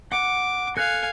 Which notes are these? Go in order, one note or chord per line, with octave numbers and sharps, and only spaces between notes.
F#5 D6
A4 F5 G#5 F#6